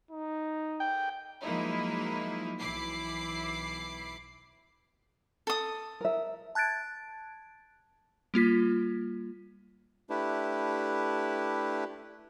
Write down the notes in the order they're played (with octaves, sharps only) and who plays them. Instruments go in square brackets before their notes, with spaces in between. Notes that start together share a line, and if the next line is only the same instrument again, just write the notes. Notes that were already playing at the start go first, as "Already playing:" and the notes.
[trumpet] D#4
[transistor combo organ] G5
[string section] F3 F#3 G#3 A#3 D#4 E4
B1 E3 E4 B5 D6 C7
[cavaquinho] A4 D#6
[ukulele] A#4 E5
[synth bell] A5 F#6 G#6 A6 D7
G3 A#3 F4 B6
[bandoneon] A3 D4 E4 G4 B4